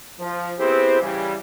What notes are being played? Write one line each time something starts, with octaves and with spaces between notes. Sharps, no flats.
F3
B3 C4 E4 G4 G#4 C5
C#3 E3 G3